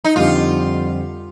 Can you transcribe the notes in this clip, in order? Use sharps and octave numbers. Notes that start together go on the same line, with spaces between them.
D#4
F2 D3 G3 C4 F4 G4